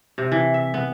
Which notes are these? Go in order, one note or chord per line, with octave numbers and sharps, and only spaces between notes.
C3
E3
E5
B3